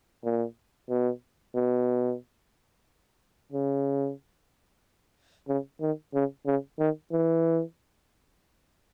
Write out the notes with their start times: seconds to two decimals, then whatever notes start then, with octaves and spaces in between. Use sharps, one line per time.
0.24 A#2
0.89 B2
1.55 B2
3.52 C#3
5.48 C#3
5.81 D#3
6.14 C#3
6.46 C#3
6.79 D#3
7.12 E3